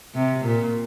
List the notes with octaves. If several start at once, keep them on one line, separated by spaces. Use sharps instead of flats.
C3
A#2